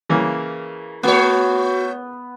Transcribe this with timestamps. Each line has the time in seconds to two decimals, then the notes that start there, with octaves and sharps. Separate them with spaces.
0.09 C#3 E3 A#3
1.03 A3 B3 F#4 C#5